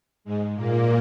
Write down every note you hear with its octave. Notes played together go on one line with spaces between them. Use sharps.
G#2 G#3
A#2 A#3